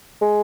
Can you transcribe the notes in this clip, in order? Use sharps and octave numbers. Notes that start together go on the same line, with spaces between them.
G#3